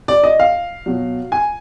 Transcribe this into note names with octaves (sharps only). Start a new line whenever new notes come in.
D5
D#5
F5
B2 F#3
G#5